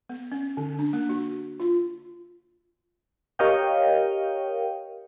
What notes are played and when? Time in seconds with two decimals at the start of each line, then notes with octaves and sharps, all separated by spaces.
0.09 B3
0.32 C#4
0.57 D3
0.79 D4
0.93 A#3
1.09 F#4
1.60 F4
3.39 G4 A#4 C#5 D#5 F5 G5